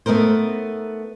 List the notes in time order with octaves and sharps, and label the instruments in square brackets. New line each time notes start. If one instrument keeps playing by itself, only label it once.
[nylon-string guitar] A3 B3 D#4 A#4 C5